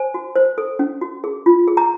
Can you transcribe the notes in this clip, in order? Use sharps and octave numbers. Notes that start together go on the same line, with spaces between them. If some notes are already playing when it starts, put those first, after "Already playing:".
Already playing: C5 G#5
F#4
C5
A4
C#4
F#4
G#4
F4
G#4
A#5